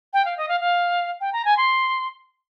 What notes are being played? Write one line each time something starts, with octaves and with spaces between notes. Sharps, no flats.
G5
F5
D#5
F5
F5
G5
A#5
G#5
C6